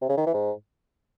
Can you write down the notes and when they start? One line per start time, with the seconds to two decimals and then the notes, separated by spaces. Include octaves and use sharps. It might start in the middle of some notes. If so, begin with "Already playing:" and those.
0.01 C3
0.09 C#3
0.17 D#3
0.26 E3
0.34 G#2